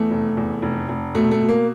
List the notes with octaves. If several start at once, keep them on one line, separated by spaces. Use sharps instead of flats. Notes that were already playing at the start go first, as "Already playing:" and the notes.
Already playing: E2 A3
F1
E2
F1
F1
B2 A3
A3
B2
A#3